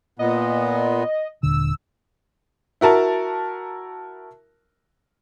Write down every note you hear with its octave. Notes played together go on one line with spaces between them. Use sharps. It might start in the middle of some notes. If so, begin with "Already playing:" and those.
A#2 B3 D#5
D#1 D3 E6
E4 F#4 A#4 A5